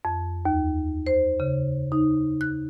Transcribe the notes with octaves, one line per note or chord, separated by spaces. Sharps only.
F2
D#2
C5
C#3
D#4
F#6